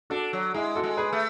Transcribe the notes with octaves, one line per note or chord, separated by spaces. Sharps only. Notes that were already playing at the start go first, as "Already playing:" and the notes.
D4 F#4 A4
F#3
G#3 E4 G#4
F#4 A4
G#3
G#4 B4
A3